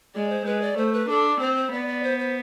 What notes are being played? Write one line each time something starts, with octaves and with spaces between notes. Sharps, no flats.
G#3 D5
C5
G#3 B4
D5
A3 C5
B4
D4 A4
C4 C5
C5
B3 D5
D5
C5
C5